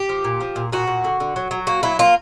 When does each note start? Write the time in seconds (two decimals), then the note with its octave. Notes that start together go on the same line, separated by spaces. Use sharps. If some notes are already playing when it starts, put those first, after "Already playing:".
Already playing: G4
0.09 F3
0.24 A#2
0.41 F3
0.56 A#2
0.72 A#2 F#4
0.87 A#2
1.04 D3
1.20 D3
1.36 F#3
1.51 F#3
1.67 A#3 F#4
1.83 F#3 E4
1.99 A#3 F4